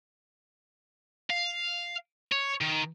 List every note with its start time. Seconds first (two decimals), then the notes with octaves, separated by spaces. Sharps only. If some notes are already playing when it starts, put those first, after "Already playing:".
1.30 F5
2.32 C#5
2.61 D#3